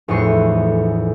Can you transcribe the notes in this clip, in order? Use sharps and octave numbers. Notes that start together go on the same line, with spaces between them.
F1 E2 A2 D#5 C#6 C7